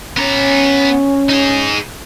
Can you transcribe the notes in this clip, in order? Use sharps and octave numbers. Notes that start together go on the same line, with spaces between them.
B3 C#4 A#5
D#4 G#4